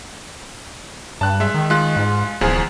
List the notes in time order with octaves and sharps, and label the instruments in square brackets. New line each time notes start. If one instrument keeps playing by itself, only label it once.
[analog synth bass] G2 [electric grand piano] A5 F#6
[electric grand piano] G#3 E5
[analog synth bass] D#3
[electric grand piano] G#3 F4 F#6
[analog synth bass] G#2
[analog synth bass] D1 [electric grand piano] E2 F3 G#4